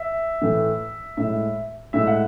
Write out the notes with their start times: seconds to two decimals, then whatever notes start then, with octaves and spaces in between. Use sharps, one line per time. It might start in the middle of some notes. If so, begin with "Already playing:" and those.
Already playing: E5
0.41 A2 E3 A3
1.17 A2 G#3 E5
1.93 A2 G#3 E5
2.07 F#5